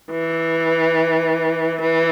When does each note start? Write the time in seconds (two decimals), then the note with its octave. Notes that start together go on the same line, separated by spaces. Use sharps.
0.11 E3
1.81 E3